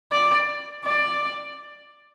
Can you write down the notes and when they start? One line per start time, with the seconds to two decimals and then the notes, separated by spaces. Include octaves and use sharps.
0.12 D5
0.85 D5